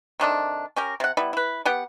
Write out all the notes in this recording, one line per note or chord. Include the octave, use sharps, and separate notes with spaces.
C3 D#3 D4 A4
C#4 G4 A#4
C3 F#5
G3 B3 E4
E4 B4
B3 G4 F#5